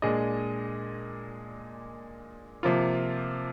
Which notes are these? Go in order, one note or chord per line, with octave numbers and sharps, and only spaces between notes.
A#2 G#3 D4 G#4 D#5
C3 F3 A#3 F4